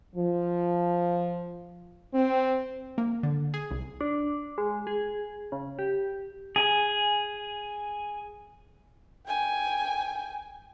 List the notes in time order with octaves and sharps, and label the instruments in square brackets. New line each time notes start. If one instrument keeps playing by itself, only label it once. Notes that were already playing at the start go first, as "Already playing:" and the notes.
[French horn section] F3
C4
[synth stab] A#3
D3
G#4
C2
[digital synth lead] D4
G#3
G#4
C#3
G4
[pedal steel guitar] G#4 G#5
[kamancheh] G5 G#5